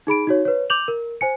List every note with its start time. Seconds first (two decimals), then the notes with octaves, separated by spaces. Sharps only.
0.07 D#4 G#4 B5 D7
0.27 D#4 F#4 C#5
0.45 B4 C#5
0.70 D6 G6 F7 F#7
0.88 A#4
1.21 C5 G#5 C#7